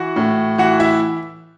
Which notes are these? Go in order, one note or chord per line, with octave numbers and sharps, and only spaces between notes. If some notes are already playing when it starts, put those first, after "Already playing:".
Already playing: E3 F#4 F#5
A2
E3 F#4 F#5
E4 E5